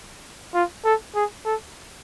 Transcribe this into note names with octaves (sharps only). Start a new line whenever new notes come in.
F4
A4
G#4
A4